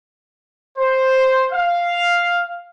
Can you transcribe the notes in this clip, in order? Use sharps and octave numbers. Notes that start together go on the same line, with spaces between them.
C5
F5